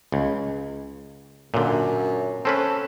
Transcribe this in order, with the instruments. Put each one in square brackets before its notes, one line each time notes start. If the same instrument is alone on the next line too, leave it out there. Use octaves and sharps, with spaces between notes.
[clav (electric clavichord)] C#2
[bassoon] F#2 [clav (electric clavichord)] A#2 D3
[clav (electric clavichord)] C4 C#4 B4 [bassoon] A4